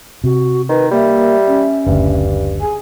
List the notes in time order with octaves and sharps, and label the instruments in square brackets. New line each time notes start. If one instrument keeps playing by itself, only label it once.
[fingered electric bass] C3 [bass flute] F#4
[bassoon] D#3 [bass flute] B4
[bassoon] G3 [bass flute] A#3 [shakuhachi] E5
[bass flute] C#4
[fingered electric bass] F#1 D2 [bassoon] G2
[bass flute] G#4 [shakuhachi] G#5